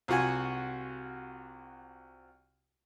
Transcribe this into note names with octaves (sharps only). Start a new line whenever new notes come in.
C2 F4 F#4 G#5